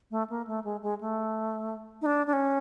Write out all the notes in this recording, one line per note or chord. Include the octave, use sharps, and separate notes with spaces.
A3
A#3
A3
G#3
G#3
A3
D#4
D4
D4
C#4